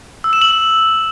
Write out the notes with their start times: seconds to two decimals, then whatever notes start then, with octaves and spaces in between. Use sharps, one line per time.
0.24 E6
0.33 E7
0.42 F#7